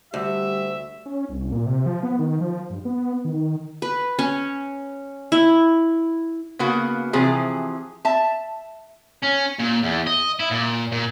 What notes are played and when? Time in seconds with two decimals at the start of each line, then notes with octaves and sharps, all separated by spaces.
0.14 D2 G3 G4 E5
1.05 C#4
1.29 C2
1.52 A#2
1.66 C3
1.86 F3
2.03 B3
2.19 D#3
2.41 F3
2.70 G2
2.85 B3
3.25 D#3
3.82 B4
4.19 C#4
5.32 E4
6.59 C#3 A#3 B3 F#4
7.13 C3 E3 F3 G#4
8.05 E5 A5
9.23 C#4
9.60 A#2
9.83 E2
10.07 D#5
10.39 E4
10.51 A#2
10.92 A#2